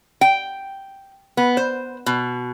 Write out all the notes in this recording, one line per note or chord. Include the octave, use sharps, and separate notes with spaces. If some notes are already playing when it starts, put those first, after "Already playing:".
G5
B3
C5
B2